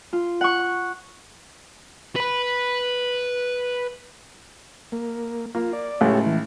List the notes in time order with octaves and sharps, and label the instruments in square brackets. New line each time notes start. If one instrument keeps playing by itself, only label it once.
[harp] F4
F#5 C#6
[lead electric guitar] B4 B5
[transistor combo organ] A#3
[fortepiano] A#3 [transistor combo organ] F4
[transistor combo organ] D5
[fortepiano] C#2 A2 [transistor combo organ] G4 A4 C#5
[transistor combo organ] E3